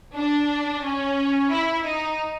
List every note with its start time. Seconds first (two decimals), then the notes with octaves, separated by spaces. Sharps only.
0.15 D4
0.84 C#4
1.51 E4
1.85 D#4